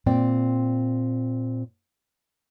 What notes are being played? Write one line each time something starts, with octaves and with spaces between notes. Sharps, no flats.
A#2 C4 D5 G5